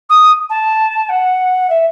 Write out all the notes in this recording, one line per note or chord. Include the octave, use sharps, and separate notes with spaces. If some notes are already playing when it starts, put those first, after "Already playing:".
D#6
A5
F#5
E5